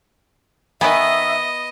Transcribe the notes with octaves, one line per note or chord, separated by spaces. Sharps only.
D#3 B3 B4 D#5 E5 G#5